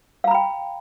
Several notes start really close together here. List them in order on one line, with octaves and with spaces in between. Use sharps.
F5 A#5 B5 G5